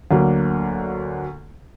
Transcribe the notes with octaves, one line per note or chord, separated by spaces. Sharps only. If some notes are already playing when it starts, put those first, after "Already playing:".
D2 D3 F#3 A#3